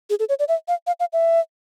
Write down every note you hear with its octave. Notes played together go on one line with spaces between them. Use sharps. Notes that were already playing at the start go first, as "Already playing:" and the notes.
G#4
A4
C#5
D5
E5
F5
F5
F5
E5